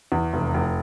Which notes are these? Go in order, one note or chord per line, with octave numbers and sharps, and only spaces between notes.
E2
F1
F1